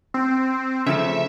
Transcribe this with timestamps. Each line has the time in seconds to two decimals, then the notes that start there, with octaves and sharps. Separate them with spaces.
0.14 C4
0.86 C#3 F3 A3 E5